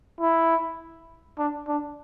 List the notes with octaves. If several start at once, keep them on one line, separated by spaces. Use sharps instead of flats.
E4
D4
D4